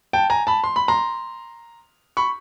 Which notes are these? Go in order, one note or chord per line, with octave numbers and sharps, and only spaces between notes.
G5 A5
G#5 A#5
A5 B5
C6
B5
A#5 C6
B5 C#6